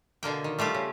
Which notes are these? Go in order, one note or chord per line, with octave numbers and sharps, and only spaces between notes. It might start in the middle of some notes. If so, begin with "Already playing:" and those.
B2 D3 A#3 G5
D#3
G3 A3 F4 G4
C#3